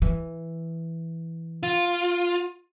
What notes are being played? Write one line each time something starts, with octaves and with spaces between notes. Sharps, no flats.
E3
F4